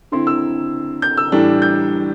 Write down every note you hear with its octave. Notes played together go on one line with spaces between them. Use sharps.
D3 C4 E4 C6
E6
G6
E6
A2 E3 G3 D4
G6